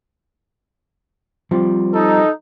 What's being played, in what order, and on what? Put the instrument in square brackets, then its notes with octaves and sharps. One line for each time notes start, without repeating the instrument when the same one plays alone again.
[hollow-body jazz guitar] F3 G3 C4
[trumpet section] D#4 A4